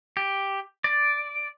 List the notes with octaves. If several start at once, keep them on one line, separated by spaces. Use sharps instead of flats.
G4
D5